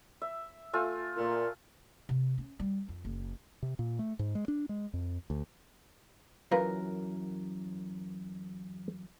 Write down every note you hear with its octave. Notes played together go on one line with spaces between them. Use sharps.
E5
A3 F4 G#5
A#2
C3
C#4
G3
F2
F#1
C3
A#2
A3
G#2
G#3
D4
G#3
F2
D2
F#2 E3 F4 A#4 B4